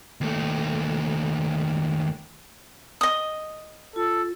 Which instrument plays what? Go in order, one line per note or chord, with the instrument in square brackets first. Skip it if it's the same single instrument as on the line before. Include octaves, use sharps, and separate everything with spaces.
[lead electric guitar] D#2 A3
[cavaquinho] D#5 D#6
[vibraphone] F4 [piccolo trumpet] A4